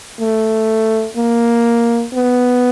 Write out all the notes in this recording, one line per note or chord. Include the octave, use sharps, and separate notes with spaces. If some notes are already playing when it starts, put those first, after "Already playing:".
A3
A#3
B3